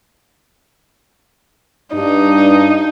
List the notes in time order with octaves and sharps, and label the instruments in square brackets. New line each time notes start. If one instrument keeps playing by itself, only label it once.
[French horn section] G2 D4 [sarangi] D#4